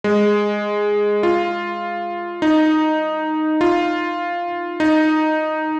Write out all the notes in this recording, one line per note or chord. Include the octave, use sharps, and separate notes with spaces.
G#3
F4
D#4
F4
D#4